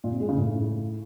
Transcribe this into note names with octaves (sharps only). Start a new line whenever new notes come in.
A#2
C3
G#3
C#3
A2